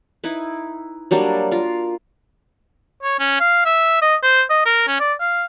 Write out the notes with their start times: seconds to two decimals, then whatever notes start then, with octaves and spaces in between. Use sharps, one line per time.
0.24 D#4 E4 B4
1.11 F#3 G3 A#3 D4
1.52 F4 A#4
3.03 C#5
3.19 C#4
3.40 F5
3.66 E5
4.02 D#5
4.23 C5
4.50 D#5
4.65 A#4
4.88 C#4
5.00 D5
5.20 F5